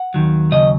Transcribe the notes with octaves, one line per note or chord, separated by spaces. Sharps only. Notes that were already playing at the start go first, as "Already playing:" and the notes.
Already playing: F#5
D#2 D#3 F#3
D#2 C#3 F#3 D#5